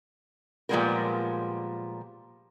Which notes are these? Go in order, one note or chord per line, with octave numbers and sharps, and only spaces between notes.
A#2 F3 G3 G#3 B3 A#4